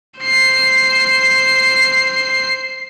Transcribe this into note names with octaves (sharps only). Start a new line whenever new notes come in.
C5 C7